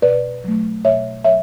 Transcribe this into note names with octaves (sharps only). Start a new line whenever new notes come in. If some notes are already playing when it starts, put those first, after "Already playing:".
B2 B4 D5
F#3 A3
B2 C#5 E5
F#3 C#5 E5